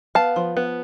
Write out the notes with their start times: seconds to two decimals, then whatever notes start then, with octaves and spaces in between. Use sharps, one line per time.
0.15 B3 F5 A5
0.36 F3
0.57 B3